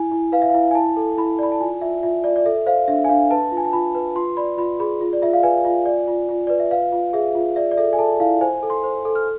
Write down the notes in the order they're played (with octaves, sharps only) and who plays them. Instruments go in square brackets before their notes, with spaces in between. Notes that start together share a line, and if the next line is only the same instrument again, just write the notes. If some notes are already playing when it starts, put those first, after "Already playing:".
Already playing: [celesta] E4 G#5
E4
B4 F5
E5
E4 F5
G#5
E4 A5
A4
E4 B5
D5 B5
A5
F4 G#5
F4 E5
F4 E5
F4 D5
D5
A4 E5
C5 F5
D4 E5
G#5
D4 F5
B4 A5
F4
G#5
A5
F4 B5
B4
F4 C6
D5 B5
F4 B5
G#4 B5
F4
D5
F4 E5
F5
B4 G#5
F4
D5
F4
F4
B4 D5
E5
B4 F5
F4
G#4 E5
F4
D5 E5
D5
A4 E5
G#5
A4 A5
E4 F5
C5 G#5
A4
C6
C5
A4
F6